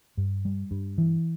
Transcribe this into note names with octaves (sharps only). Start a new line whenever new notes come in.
G2
G3
G2
E3